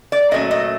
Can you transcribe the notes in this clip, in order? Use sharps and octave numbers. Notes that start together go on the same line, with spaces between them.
D5
A#2 F#3 A3 C#4 D#5
D#5